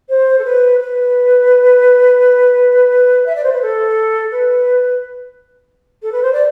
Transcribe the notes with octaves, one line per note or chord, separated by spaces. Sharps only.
C5
A4
B4
B4
E5
D5
C5
B4
A4
B4
A4
B4
C5
D5